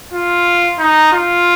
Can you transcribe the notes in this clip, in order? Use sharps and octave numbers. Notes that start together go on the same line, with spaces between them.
F4
D#4
F4